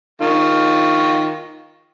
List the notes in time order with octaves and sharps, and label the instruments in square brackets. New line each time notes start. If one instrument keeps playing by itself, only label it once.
[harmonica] D#3 F4 C#6